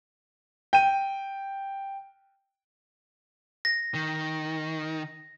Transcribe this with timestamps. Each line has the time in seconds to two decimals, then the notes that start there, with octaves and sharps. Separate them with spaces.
0.73 G5 D#7
3.65 A#6
3.95 D#3